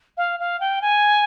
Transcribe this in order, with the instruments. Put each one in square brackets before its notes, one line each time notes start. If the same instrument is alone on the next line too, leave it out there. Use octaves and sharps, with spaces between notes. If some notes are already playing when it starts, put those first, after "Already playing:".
[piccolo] F5
F5
G5
G#5